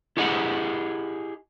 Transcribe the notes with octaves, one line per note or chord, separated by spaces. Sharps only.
E4 G4 G#4 D#5 F#5